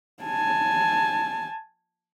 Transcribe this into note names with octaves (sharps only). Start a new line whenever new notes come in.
G#5 A5